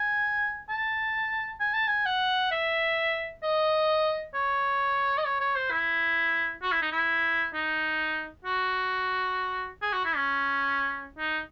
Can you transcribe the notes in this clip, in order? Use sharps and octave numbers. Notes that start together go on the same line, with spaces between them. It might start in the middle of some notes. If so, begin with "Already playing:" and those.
Already playing: G#5
A5
G#5
A5
G#5
F#5
E5
D#5
C#5
D#5
C#5
C#5
C5
E4
F#4
E4
D#4
E4
D#4
F#4
G#4
F#4
E4
C#4
D#4